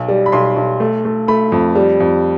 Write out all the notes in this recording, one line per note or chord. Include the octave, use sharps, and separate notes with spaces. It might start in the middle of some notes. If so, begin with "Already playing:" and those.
Already playing: B1
G3
B5
B1 C6
B1
A3
A3
A3 B5
F2
G3
F2